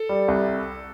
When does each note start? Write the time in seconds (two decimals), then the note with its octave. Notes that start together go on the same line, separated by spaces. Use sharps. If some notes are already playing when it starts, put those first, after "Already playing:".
Already playing: A4
0.09 G3
0.28 C2